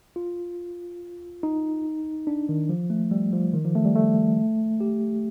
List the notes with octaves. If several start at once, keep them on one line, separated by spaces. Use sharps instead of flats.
F4
D#4
D4
D#3
F3
A3
G3
F3
D#3
F3
A3
G3
A3
G4